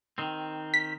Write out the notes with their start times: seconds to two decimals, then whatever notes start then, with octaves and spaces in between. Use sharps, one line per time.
0.18 D#3 C4
0.74 B6